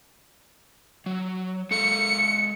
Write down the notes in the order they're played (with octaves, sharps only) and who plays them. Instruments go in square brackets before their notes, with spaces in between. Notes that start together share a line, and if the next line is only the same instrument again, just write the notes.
[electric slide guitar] F#3
[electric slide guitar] G#3 A4 F5 [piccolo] C#7